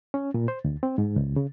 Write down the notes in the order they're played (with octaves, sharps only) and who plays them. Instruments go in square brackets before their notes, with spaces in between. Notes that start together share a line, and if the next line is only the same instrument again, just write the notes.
[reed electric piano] C#4
A#2
C5
D2
C4
G#2
C#2
C#3